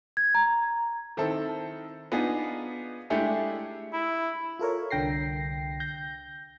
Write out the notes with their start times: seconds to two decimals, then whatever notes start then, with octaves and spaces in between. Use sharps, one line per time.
0.17 G#6
0.35 A#5
1.17 D#3 C4 E4 A4
2.12 B3 D4 D#4 F4 G#4
3.10 G#3 A3 D4 E4 G4 G#4
3.93 E4
4.59 F4 A4 A#4 C#5
4.91 C2 D3 G5 A#6 C7
5.80 G6 A#6